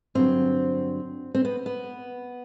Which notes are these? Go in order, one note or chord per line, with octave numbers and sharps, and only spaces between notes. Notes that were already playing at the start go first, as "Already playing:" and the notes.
G2 D3 F#3 C4
C4
B3
B3